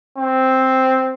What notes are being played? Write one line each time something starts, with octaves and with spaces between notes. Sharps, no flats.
C4